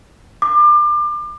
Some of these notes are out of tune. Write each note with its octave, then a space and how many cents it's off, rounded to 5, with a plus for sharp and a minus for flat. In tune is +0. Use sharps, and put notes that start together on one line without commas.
D6 +30